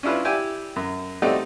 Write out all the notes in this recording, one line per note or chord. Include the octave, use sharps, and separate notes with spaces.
C#4 D4 E4 F4 B4
E4 G4 D5 G5 G#5
F#2
A3 C4 D#4 F#4 G4 D5